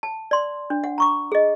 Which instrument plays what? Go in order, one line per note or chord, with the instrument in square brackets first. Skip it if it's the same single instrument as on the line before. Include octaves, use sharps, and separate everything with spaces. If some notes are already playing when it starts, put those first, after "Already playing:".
[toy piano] A5
D5 C6
D4
F#5
A#5 C#6 D6
G#4 D#5